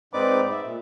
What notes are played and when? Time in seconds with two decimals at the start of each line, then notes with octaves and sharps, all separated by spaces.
0.14 G#2 C4 D#4 B4 D5 D6
0.51 E5
0.64 A#2